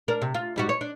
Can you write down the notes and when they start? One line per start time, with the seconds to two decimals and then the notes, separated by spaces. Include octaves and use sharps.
0.08 D4 A#4
0.22 C3
0.34 F4
0.56 G#2 G3 F#4
0.69 C#5
0.81 D4